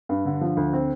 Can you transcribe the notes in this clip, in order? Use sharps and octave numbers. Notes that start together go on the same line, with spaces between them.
G2
D3
F3
D2
C4